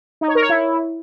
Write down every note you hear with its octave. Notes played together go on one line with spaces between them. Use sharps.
D#4
C#5
A#4
C#5
E4